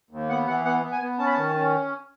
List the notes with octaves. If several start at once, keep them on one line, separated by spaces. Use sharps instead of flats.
D#2
B3 F#5
E3 F#5
B3 F#5
B3
G#5
B3
C#4 A5
B5
D#3 A5
C#4